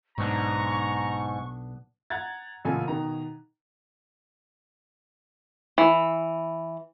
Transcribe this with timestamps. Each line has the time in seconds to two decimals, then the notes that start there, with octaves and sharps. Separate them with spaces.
0.18 B1 G#2 B3 D4 A#5 C#6
2.10 F#5 A#5 F#6 G#6 A6
2.65 A1 A#2 C#3 A4 G#5
2.88 B2 D#3 A#5
5.78 E3